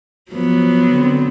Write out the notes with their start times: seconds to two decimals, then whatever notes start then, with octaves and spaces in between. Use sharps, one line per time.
0.32 F3 F#3 B3
0.91 D3 C4